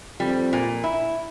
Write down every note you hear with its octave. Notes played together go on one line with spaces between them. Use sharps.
F2 G3
A#2
E4